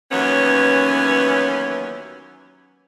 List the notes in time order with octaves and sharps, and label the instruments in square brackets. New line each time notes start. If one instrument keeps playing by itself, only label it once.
[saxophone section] D#2 E3 F#3 B3 C#4